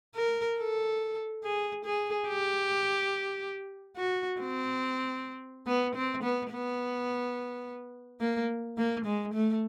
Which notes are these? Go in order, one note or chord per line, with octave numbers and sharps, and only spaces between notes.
A#4
A4
G#4
G#4
G4
F#4
C4
B3
C4
B3
B3
A#3
A#3
G#3
A3